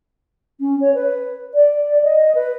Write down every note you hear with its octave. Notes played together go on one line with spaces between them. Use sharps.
C#4
C#5
B4
D5
D#5
B4